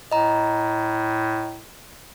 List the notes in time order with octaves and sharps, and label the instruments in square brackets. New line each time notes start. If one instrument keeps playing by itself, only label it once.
[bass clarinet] A2 [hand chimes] D#5 A#5